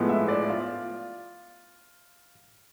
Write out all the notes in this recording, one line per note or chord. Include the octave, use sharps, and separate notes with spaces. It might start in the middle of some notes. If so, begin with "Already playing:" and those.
Already playing: A2 F3 G#3 B3
E5
D5
F4